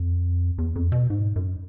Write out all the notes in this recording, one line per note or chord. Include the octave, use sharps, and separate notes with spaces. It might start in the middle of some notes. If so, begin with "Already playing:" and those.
Already playing: F2
E2
F2
B2
G#2
F#2